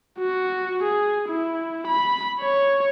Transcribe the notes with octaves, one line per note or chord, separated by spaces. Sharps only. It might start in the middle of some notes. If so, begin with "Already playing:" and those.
F#4
G#4
E4
B5
C#5